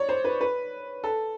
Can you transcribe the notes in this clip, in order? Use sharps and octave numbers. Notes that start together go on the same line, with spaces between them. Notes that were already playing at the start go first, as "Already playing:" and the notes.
Already playing: C#5 D5
C5
B4
B4
A4